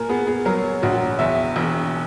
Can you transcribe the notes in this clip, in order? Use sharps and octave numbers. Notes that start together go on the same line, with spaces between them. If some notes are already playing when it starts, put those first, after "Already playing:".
Already playing: A#2 A#4 G#5
B3 G#4
G#4
F#3 A#4
A#1 F#4
E2 E5
E1